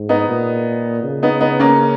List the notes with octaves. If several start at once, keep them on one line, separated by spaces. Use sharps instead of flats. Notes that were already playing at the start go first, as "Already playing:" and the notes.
Already playing: G#2
B3 D#4
A#2
C#3
B3 D#4
B3 D#4
A#3 C#4